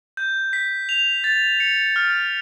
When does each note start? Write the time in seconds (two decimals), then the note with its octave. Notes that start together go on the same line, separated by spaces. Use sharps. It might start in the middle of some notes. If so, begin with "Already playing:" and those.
0.17 G6
0.53 B6
0.89 F7
1.24 A6
1.60 C#7
1.96 F6